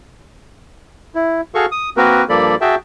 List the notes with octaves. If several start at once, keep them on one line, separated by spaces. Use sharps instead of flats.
E4
F#4 G#4 A4 F5 C#6
D#6
A#3 C4 F#4 A#4 B4
G2 F3 A#3 A4 D5 B5
F#4 G#4 E5 G5 A5